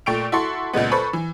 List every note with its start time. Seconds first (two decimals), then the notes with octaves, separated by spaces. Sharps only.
0.06 A#2 A3 G5 C#6 D7 F7
0.32 E4 F#4 A4 C6 C#6
0.73 C#2 A#2 G#3 B3
0.92 A4 B4 C5 B5 C#6
1.13 E3